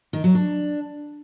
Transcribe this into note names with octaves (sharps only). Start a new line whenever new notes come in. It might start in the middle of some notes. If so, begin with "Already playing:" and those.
D#3
F#3
D4